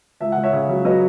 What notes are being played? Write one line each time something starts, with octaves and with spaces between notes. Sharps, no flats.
C#2 E5
C#2 F#5
C#5 E5
C#3
F#3
F#3 B4 D#5